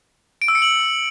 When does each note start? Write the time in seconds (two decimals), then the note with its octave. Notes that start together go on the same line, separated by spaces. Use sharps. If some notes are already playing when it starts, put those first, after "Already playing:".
0.42 D7
0.48 E6
0.55 C#7
0.62 F#7